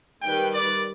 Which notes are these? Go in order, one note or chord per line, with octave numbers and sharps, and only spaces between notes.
D#3 G3 B4 G5
D5